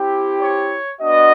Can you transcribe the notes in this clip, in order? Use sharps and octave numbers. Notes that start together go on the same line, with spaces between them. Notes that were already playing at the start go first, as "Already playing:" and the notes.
Already playing: C4 E4 G4
C#5
B3 D4 F#4 D#5